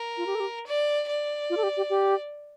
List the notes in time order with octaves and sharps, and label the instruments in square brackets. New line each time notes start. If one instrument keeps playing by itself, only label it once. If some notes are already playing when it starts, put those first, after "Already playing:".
Already playing: [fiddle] A#4
[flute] F4
G4
A4
G4
[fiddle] D5
D5
[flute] F4
A4
G4
G4
G4